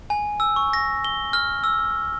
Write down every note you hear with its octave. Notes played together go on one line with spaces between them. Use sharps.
G#5
E6
C#6
A#6
G7
F6
E6